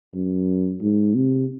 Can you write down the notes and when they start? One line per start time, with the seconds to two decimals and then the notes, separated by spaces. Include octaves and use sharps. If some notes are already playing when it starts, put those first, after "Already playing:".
0.14 F#2
0.82 G#2
1.15 C3